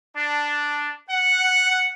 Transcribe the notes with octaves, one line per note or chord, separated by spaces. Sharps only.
D4
F#5